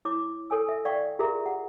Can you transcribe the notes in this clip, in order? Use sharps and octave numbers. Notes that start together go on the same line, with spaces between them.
E4 C#5 D6
A4 C#5 G#5 E6
E5
D5 F5 G5 C#6
F4 G4 G#4 A#4 E5 A#5
F#5